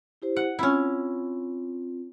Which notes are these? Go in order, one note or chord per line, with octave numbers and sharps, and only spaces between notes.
E4 G4 C5
F#5
C4 C#4 E4 F4